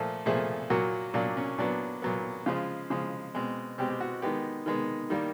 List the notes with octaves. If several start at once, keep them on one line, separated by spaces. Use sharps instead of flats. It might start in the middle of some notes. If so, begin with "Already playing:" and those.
Already playing: A#2 F3 A3 A4
A#2 F3 A3 G#4
A#2 F#3 A#3 F#4
A#2 F#3 A#3 D4
C#4
A#2 F#3 B3 D4
A#2 F#3 B3
C#3 F3 G#3 F4
C#3 F3 G#3
B2 G#3 C4
B2 G#3 C4 G4
G4
F#4
D#3 G#3 B3 G4
D#3 G#3 B3
D#3 G3 A#3